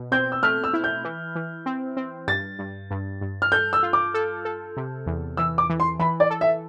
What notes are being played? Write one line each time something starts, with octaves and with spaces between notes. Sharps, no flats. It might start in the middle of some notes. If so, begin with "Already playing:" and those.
Already playing: B2
C4 G6
E6
A3 F6
E6
E4
G6
E3
E3
C4
C4
G2 A6
G2
G2
G2
F6
A4 G6
E6
F4
D6
A4
A4
C3
E2
E3 E6
D6
E3
C6
E3 B5
D5
A4
E5